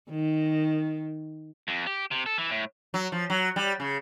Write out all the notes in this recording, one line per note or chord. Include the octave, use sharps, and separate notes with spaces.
D#3
F2
G4
C3
A4
E3
A2
F#3
F3
F#3
G3
C#3